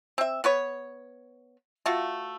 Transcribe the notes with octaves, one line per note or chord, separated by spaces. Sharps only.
C4 E5
B3 B4 C#5
A3 F4 F#4